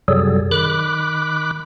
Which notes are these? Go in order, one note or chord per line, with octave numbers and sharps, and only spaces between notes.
F#2 C3 F#3 G3 G#4 A4
D#3 B5 D6 F#6